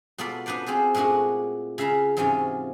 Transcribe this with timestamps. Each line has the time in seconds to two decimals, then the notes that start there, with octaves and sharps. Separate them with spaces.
0.18 B2 B3 F4 A4 D5 B5
0.46 B3 D4 B4 C5 D5
0.66 C4 F4 G#4 C5
0.95 A#2 G#3 A3 D4 F#4
1.78 C#3 E5 F5 A#5 B5
2.17 G#2 C3 E3 F#3 C#4 F4